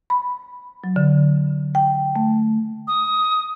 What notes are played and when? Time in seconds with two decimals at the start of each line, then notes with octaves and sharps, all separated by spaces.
0.10 B5
0.84 F#3
0.96 D3
1.75 G5
2.16 A3
2.88 D#6